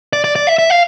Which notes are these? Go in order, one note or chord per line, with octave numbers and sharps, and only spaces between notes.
D5
D5
D5
E5
E5
F5